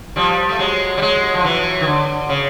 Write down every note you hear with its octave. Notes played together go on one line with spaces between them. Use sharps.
F3 G3
A3
F#3 G#3
G3
F#3 G#3
F3
E3 F#3
D#3
D3
C#3